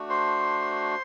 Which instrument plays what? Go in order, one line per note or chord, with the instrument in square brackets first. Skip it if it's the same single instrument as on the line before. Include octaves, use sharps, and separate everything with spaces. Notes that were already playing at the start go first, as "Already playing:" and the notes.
Already playing: [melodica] A3 D4 F#4
C5 C6